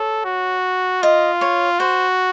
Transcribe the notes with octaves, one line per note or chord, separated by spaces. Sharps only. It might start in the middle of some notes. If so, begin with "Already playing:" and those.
Already playing: A4 C#5
F#4
F4 D#5
C#5
F#4 C5